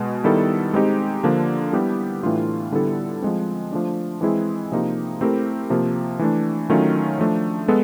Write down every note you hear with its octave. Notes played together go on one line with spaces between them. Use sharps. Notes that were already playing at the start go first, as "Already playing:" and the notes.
Already playing: B2 G#3 B3
D#3 G3 B3 E4 A4
G#3 C4 D#4 G4
D3 F3 A#3 D4
G3 B3 E4 G4
A2 E3 A3 D4 F4
D3 G3 B3 E4 A4
F3 G#3 C4
F3 A3 D4
E3 G#3 C4 E4 G#4
C3 F3 A#3 D#4 G4
A3 C4 E4 G4 A#4
C3 F3 A#3
E3 A3 D4
D#3 F#3 A3 C#4 F4
F3 A3 D4
G#3 B3 A4